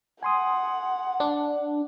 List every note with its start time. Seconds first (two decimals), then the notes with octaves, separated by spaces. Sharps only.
0.23 F#5 G#5 C6 D#6
1.20 D4